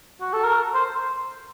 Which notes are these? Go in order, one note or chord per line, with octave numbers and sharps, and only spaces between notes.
F#4
A4
A#4
C5